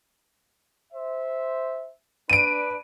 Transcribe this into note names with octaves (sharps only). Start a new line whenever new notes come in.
C5 E5
D4 B4 D7 D#7